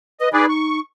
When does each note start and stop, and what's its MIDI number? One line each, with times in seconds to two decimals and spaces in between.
0.20 0.29 71
0.20 0.29 75
0.33 0.79 63
0.33 0.46 68
0.33 0.46 71
0.33 0.46 74
0.49 0.80 85